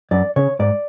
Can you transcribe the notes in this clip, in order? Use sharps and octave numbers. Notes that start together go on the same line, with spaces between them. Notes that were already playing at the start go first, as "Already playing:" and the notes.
F#2 D5
C#3 C#5
G#2 D5